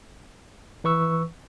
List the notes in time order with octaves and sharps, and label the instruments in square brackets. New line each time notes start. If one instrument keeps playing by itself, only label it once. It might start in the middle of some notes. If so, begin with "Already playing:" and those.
[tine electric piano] E3 B4 C#6 E6